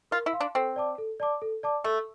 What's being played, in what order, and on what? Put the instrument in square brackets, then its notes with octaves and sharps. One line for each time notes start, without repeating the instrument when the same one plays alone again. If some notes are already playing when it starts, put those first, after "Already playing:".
[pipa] F4 [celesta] A#4
[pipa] E4
[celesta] F5 C6
[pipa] D4
[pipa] C4 [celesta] A4
[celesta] D5 A5 D6
A4
D5 A5 D6
A4
D5 A5 D6
[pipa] A3 [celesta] A4